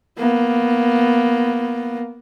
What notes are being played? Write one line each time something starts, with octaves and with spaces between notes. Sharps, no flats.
A#3 B3